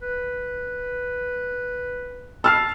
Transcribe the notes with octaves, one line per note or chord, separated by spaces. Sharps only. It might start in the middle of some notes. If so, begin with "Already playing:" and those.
B4
A5 E6 F6 C7